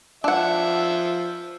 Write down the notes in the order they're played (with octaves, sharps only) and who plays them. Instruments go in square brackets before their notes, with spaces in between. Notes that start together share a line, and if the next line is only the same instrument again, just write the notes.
[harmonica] F3 E5 [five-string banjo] D4 F#5